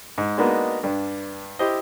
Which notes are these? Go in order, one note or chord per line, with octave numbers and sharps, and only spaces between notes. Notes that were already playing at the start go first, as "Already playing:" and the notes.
G#2
G#3 A#3 B3 D4 D#4 F#4
G2 D4
E4 G4 C5 D#5